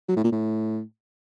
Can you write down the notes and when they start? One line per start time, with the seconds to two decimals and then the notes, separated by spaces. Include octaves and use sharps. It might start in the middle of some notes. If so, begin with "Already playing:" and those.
0.08 F#3
0.16 A2
0.24 A#2
0.32 A2